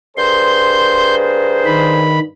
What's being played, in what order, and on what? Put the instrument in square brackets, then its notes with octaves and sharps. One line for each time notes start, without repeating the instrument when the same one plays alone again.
[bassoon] G2 [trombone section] G#4 A#4 C5 [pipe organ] C6 G6
[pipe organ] D#3 B5